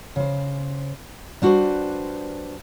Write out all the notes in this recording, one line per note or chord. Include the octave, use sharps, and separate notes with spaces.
C#3 C5
G3 D4 F#4 G4 B4 C5